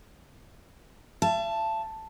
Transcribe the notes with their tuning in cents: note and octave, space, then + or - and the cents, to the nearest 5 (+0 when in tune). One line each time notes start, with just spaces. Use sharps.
E5 +45 A5 +0